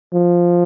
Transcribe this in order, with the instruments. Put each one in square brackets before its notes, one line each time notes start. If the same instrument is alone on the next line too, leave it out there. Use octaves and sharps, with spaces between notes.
[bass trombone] F3